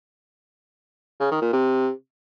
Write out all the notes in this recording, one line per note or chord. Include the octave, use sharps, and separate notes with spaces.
C#3
D#3
A#2
C3